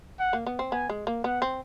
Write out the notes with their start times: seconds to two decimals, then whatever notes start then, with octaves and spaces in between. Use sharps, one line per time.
0.20 F#5
0.33 A#3
0.47 B3
0.59 C4
0.72 B3 G#5
0.90 G#3
1.07 A#3
1.24 B3 F#5
1.42 C4